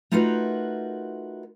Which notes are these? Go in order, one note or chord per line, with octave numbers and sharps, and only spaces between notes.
A3 D#4 F4 F#4 A#4 B4